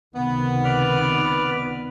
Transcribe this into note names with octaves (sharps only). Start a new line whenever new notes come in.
C#2 C3 D#3 B3
B4 D5 F6